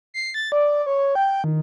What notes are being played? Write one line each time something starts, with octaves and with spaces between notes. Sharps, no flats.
C7
A6
D5
C#5
G5
D#3